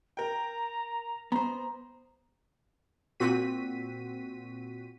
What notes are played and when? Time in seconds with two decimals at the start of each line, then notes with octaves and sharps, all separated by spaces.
0.17 A#4 G5 A#5
1.32 B3 C5 A#5
3.20 A#2 C4 F#4 B6 D#7